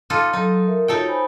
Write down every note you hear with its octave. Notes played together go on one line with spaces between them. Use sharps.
D#4 F4 A4 D6
F#3 D#4 A4
A#4 E5
D#4 F4 F#4 A4 C#5 G5
C5 G#5 B5